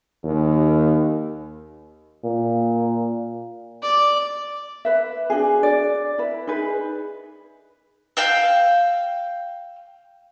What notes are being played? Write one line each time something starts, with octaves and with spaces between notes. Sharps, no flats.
D#2
A#2
D5
B4 E5
D4 D#4 F#4 G#4
D5
E4 B4
D#4 G#4 B4
F5 G5 E6